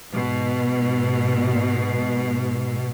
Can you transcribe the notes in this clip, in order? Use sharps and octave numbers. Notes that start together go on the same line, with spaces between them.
G#2 B2